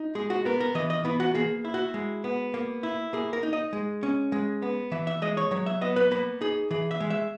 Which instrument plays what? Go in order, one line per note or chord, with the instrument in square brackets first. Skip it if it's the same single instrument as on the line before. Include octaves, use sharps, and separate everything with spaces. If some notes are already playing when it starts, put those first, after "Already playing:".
Already playing: [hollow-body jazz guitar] D#4
G#3 G#4
F#4
B3 A#4
A#4
E3 D#5
D#5
B3 E4
F#4
A#3 G#4
E4
F#4
G#3
B3
A#3
E4
A#3 G#4
A#4
D#4
D#5
G#3
C#4
G#3
B3
E3 E5
E5
G#3 D#5
C#5
F#3 C#5
E5
B3 D#5
B4
A#3 B4
D#4 G#4
E3 G#4
E5
G#3
E5